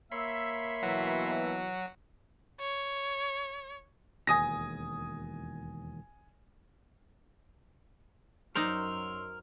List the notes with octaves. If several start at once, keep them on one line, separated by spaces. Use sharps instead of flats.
A#3 C#5 E5 B5 C6
B2 E3 F#3 F#4
C#5
E1 D#2 G#5 D#6 A#6
F#2 F#3 D#4 A#4 C5 D5 C6 E6